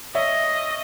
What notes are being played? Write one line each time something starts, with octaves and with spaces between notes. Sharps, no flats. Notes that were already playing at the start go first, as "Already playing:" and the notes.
C#5 D#5 E5